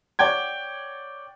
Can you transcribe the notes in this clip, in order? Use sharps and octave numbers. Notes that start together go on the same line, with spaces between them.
C#5 D5 F#5 G5 G#6